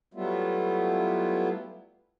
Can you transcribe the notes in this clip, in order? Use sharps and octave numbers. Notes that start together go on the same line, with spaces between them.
F#3 G3 A3 B3 E4 F4